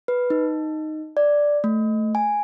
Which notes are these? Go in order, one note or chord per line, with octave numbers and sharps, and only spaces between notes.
B4
D#4
D5
A3
G#5